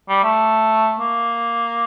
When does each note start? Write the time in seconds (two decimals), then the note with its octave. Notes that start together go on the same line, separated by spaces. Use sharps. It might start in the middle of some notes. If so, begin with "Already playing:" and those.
0.09 G3
0.24 A3
1.00 A#3